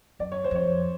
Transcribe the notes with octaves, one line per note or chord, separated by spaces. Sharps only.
F#2 D5
C#5
C5
F2 C#5